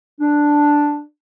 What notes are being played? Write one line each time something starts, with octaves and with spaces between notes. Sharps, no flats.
D4